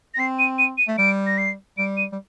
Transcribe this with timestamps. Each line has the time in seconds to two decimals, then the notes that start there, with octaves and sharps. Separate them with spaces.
0.14 A#6
0.18 C4 C7
0.39 D#7
0.59 D#7
0.78 D#7
0.88 A3
0.98 G3 D7
1.27 A#6
1.38 C7
1.78 G3 D7
1.97 D#7
2.12 G3